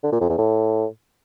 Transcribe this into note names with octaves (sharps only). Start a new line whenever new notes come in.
D3
A#2
F2
E2
A2